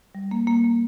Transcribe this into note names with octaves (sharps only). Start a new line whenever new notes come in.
G3
A#3
A#3
A#3